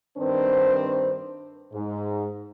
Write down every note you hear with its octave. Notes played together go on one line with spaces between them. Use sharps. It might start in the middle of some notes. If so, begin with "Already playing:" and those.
G2 D#3 C4 D4 B4 C5
G#2